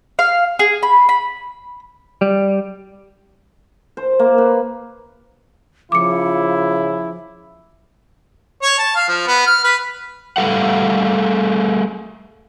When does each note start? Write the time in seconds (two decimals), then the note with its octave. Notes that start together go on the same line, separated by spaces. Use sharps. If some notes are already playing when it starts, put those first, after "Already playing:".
0.19 F5
0.59 G#4
0.83 B5
1.09 B5
2.21 G3
3.97 C5
4.19 A#3
4.38 B4
5.92 C#3 F3 E4 D6 C#7
8.62 C#5
8.78 A5
8.96 F5
9.08 F3
9.27 B3
9.47 F6
9.64 B4
10.37 G3 A3 A4 F5 F#5